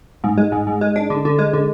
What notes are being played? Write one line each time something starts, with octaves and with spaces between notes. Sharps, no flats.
G#2
G#3
G#2
G#2
G#3
D4
D3
D3
G#3
D3